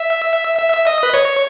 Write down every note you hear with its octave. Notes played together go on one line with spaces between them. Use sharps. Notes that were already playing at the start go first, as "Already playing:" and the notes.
Already playing: E5
E5
E5
D#5
B4
C#5